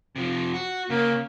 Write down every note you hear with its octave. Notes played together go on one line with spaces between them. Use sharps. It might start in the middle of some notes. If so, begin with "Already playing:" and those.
C3 F3
F#4
C#3 A#3